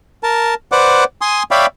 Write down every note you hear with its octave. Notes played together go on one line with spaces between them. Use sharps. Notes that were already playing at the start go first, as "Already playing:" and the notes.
A#4 A5
B4 C5 D5 F#5 D6
G#5 C6 D#6
C#5 D5 E5 F5 G5 B5